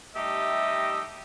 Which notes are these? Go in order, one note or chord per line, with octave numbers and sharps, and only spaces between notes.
G3 A3 D#4 G4 D#5 E5